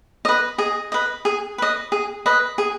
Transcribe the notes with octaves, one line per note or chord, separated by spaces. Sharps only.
B4 D#5
G#4 D#5
B4 D#5
G#4
B4 D#5
G#4
B4 D#5
G#4